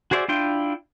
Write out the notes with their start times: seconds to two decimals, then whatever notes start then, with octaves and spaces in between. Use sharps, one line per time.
0.11 F#4 G#4 C5 D5 E5
0.28 D4 E4 F4 G5 C6